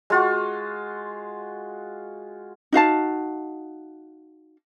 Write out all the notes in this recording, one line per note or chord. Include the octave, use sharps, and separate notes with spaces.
G#3 F4 F#4
D#4 F#4 F5 A5